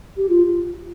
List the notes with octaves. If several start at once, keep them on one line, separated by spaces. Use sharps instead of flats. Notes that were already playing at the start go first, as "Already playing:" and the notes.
G4
F4